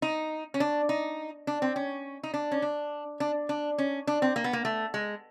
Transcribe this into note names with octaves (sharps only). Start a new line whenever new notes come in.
D#4
C#4
D4
D#4
D4
C4
C#4
D#4
D4
C#4
D4
D4
D4
C#4
D4
C4
A#3
B3
A#3
A3
G#3